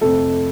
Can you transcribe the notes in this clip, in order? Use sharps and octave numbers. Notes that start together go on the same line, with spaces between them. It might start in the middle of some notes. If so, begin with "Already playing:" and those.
F2 C3 F3 A3 A4